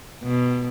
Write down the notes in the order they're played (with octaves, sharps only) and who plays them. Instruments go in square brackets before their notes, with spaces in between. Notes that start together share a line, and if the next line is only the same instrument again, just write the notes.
[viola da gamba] B2